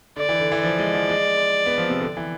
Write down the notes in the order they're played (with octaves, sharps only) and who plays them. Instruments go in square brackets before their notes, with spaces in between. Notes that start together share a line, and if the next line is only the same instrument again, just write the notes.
[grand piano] D3 [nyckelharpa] D5
[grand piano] E3
D3
E3
[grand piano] F3 [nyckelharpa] D5
[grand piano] G#3
F3
G#3
B3
F3
C3
D3
E3